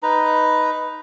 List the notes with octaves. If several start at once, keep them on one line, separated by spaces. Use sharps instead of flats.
D#4 B4 A#5